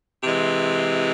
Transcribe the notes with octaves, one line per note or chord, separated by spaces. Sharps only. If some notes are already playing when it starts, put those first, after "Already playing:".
C3 E3 G#3